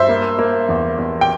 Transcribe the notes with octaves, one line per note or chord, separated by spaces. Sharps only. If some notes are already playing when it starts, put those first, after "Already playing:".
Already playing: G2 C5 E5
A#3
A#3
E2
E2
G5